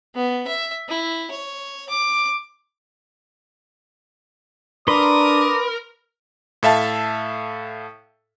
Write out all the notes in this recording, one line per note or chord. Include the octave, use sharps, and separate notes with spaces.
B3
E5
E4
C#5
D6
D4 A#4 B4 D5 C6 D#6
A2 A4 E5 F5 A5